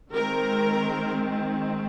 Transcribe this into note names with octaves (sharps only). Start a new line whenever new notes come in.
D#3 G#3 C4 A#4